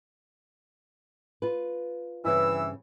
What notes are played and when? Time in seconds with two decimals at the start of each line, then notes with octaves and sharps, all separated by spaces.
1.42 F4 B4
2.25 G2 C#3 E3 C4 E6